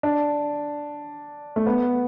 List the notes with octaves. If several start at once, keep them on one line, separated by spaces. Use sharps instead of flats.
D4
A3
B3